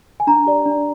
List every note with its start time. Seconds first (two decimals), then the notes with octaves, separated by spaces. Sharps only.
0.20 G#5
0.27 D4 A#5
0.46 G4 D5
0.66 D4